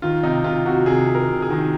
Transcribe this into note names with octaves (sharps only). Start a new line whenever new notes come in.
D#3 F4
C3 D#4
C3 F4
C3 F#4
C3 G#4
C3
A#4
C3
G#4
D#3